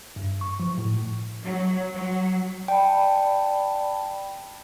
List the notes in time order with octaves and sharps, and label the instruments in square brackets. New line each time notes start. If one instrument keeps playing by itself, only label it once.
[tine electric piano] G2
C#6
F3
A2
[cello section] F#3
F#3
[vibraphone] D5 A5 B5 [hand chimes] G5